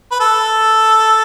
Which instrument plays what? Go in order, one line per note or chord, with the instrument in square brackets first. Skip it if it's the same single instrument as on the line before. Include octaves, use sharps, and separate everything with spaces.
[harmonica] B4
A4